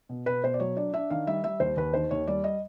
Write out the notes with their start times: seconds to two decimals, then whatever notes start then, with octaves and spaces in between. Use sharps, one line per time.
0.09 B2
0.26 B2 B4
0.44 B2 C5
0.54 D5
0.60 F#3 C#5
0.77 D4 D5
0.93 D4 E5
1.10 D#3 F5
1.27 G3 E5
1.44 G3 E5
1.60 D#2 C5
1.77 D#2 B4
1.93 D#3 C5
2.11 D#2 C#5
2.27 G3 D5
2.44 D#5